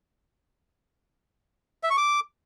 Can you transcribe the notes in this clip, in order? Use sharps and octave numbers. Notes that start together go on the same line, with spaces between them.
E5
C#6
D6